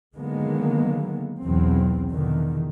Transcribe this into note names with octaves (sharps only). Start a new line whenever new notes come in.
D3 D#3 F#3 G#3 A#3 B3
B1 E2 F#3 C4
E2 B2 D3 D#3